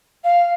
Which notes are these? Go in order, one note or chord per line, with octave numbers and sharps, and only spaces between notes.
F5